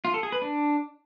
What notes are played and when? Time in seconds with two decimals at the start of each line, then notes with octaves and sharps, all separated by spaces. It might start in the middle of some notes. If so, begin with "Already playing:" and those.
0.05 F4
0.14 A4
0.23 G#4
0.32 B4
0.42 D4